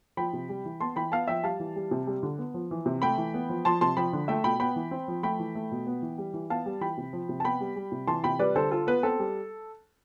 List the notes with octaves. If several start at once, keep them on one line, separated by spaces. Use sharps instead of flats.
F3 G5 B5
C3
G3
E3
B3 A5 C6
E3 G5 B5
B3 F5 A5
F3 E5 G5
G3 F5 A5
E3
G3
C3
G3
D3
B3
F3
E3
C3
A3 G5 B5
E3
B3
F3
F3 A5 C6
C3 A5 C6
F3 G5 B5
D3
A3 E5 G5
B2 G5 B5
B3 G5 B5
E3
C4
F3
A3 G5 B5
E3
A3
B2
B3
E3
G3
E3
B3 F5 A5
G3
E3 G5 B5
C3
F3
C3
A5
B3 G5 B5
G3
G3
C3
E3 A5 C6
C3 G5 B5
G3 B4 D5
D3 A4 C5
F4 A4
B3 B4
C4 A4
G3